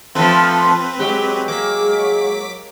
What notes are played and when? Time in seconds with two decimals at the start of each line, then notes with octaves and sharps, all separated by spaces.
0.15 F3 A3 C4 F4 B4
0.99 F#3 G#3 G4
1.48 A#3 D6 B6